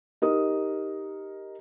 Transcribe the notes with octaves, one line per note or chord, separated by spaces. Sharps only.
D#4 G4 A#4 D#6